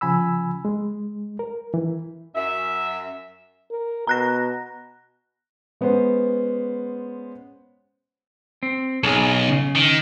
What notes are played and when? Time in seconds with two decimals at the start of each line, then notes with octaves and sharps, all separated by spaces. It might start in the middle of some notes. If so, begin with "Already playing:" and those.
0.01 C#3 F3 G#5 B5 E6
0.65 G#3
1.39 A#4
1.74 E3
2.36 F#2 E5
3.71 A#4
4.07 B2 A#5 F#6 A#6
5.81 G#3 B3 C#4 C5
8.63 C4
9.03 B1 G#4 A4
9.49 C#3
9.75 D#3